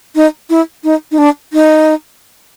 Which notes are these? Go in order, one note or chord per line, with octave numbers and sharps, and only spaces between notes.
D#4
E4
D#4
D#4
D4
D#4